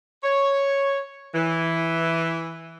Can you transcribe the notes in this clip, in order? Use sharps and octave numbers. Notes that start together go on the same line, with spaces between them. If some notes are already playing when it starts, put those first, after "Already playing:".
C#5
E3